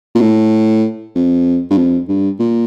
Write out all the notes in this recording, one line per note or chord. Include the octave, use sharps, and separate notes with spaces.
A#2
A2
F2
G2
F2
G2
A#2